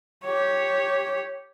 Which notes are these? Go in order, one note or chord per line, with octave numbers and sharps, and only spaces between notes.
G4 C#5